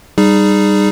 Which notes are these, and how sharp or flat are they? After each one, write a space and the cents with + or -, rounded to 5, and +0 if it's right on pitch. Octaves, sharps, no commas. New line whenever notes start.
G3 +0 D#4 -20 G#4 +0